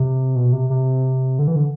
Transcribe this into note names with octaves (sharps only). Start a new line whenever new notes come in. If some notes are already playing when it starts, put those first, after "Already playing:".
Already playing: C3
B2
C3
C3
D3
E3
D3